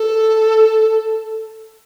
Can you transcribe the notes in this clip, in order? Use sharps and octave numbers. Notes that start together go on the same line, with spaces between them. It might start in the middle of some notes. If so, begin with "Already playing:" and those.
Already playing: A4